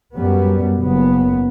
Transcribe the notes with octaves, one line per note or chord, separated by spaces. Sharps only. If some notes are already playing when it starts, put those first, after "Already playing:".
F#2 G3 B3
F#1 B3